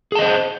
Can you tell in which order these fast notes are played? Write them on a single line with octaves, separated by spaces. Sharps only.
G#4 A5 D#5 C5